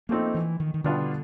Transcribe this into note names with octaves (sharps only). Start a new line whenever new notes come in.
F3 A3 A#3 C4 D#4
E3
D#3
D#3
B2 D3 G3 B3 D4 F4